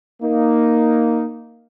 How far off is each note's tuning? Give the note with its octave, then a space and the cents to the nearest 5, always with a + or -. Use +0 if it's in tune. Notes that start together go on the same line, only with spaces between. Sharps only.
A#3 +0 D#4 +0